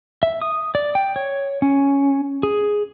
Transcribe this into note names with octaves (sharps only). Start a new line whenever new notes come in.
E5
D#6
D5
G5
C#5
C#4
G#4